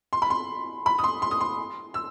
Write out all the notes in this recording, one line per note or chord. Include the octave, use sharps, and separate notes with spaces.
C6
B5
C6
B5
D#6
C6
C6
D#6
C6
E6